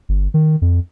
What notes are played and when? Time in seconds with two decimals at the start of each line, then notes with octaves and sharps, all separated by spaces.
0.09 G1
0.34 D#3
0.62 F2